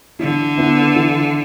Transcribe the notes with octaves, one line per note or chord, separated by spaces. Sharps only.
D3 E3
B3 E4 B4
E3